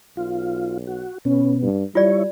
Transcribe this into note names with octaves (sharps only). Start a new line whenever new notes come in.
B1 F4
F#4
B2 B3 C#4
G2
G3 E4 F4 C#5 D5